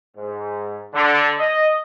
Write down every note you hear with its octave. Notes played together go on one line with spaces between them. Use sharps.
G#2
D3
D#5